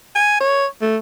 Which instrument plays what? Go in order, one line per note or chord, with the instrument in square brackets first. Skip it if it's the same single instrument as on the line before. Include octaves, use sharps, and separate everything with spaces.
[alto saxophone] G#5
C#5
A3